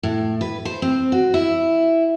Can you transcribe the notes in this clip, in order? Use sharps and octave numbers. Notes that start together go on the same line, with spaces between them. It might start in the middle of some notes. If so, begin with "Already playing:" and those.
A2
B4
C5
C4
F#4
E4